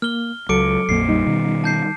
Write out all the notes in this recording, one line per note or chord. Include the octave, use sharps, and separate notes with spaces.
A#3 F6 G7
C#2 F#3 A4 D6 C#7 D7
A#1 F2 A#3 C7
G3 D#4
B2 D#3
A5 G6 C7